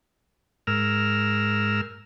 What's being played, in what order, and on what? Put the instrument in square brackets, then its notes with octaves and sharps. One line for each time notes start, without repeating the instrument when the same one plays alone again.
[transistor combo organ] G#2 A#4 E6 F6